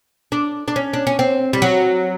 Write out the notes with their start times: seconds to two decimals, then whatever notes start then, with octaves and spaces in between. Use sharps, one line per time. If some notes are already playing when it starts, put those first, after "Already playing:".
0.32 D4
0.68 D4
0.76 C#4
0.93 D4
1.07 C#4
1.19 C4
1.53 G3
1.62 F#3